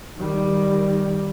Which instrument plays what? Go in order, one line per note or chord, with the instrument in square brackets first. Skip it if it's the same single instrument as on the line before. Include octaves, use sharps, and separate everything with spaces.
[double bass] D#3 G3